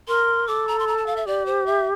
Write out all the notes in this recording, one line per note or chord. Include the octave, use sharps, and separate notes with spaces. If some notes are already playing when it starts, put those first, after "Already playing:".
A#4 C6
A4 D6
A#5
C6
A#5
A5
F5
E5
G4 D5
C5
E5